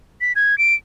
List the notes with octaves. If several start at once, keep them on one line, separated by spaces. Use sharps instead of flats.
B6
G#6
D7